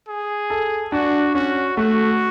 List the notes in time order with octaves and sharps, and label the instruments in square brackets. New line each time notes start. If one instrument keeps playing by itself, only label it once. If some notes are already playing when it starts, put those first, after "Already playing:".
[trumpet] G#4
[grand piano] A4
[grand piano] D4 [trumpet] F#4
[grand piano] C#4 [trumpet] F#4
[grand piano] A3 [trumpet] F#4